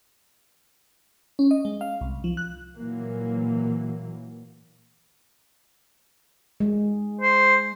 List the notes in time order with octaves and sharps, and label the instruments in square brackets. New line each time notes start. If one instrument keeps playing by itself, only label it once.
[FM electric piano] C#4
D#5
G#3
F5
C2
F3
F#6
[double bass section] A#2 E3 F#3 A#3
[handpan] G#3
[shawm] C5